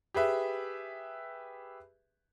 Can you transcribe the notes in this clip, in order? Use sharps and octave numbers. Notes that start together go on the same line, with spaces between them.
G4 G#4 B4 E5